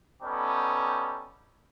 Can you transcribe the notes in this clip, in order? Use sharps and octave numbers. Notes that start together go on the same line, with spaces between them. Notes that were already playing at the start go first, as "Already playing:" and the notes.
G3 B3 C#4 D#4 G4 A4